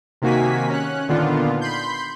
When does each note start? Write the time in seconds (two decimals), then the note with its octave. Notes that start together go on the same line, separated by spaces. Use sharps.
0.22 C3 D#3 A#3 F#4 G#5 B6
0.69 C#4 F#6
1.08 A#2 D3 D#3 B3 D4 F4
1.61 B5 C6 G6